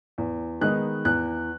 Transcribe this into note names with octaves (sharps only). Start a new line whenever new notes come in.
E2
D#3 G#3 B3 D#4 F#6
E2 F#6